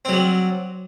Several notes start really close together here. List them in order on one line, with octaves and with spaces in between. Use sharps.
C4 F#3 G3